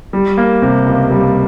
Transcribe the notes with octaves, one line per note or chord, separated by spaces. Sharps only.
G3
A#3
C3
C#2
G3